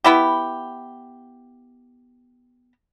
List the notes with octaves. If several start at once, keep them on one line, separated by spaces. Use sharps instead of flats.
B3 E4 G4